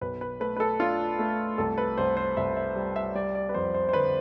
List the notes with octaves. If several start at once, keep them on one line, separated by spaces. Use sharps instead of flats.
B1 B4
B4
A3 B4
B4
A4
D4 F4
A3
C2 A4
B4
C2 C5
C5
C2 E5
E5
G3
E5
G3 D5
D5
B4
F2 C5
C5
C5
D3 B4